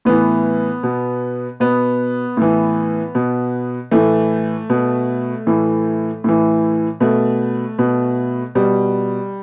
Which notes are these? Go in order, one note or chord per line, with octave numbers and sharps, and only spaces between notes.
A2 E3 B3
B2
B2 B3
A2 E3
B2
A2 E3 A3
B2
A2 E3
A2 E3
B2 A3
B2
B2 G3